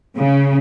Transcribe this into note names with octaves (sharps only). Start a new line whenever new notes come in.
C#3